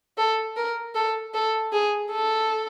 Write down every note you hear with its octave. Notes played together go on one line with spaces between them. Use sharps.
A4
A#4
A4
A4
G#4
A4